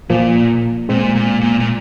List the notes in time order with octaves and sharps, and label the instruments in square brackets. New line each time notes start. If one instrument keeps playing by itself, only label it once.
[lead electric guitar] A#2 [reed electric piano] F3 A#3
[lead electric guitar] A#2 [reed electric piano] G#3 C4
[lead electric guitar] A#2
A#2
A#2